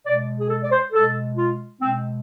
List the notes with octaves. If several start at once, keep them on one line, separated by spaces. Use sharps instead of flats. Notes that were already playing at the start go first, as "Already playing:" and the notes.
B2 G#3 D5
G#4
A4
D5
C5
B2 G#3 A4
F4
B2 G#3 C4